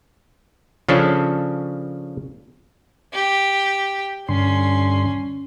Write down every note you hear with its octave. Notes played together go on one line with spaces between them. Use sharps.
C#3 F3 C#4 D4 A4
G4
G2 D3 C#4 C6